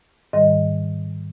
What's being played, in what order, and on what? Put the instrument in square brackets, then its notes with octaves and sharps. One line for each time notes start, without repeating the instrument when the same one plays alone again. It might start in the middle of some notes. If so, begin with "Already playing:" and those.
[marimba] G#2 D#3 G3 D#5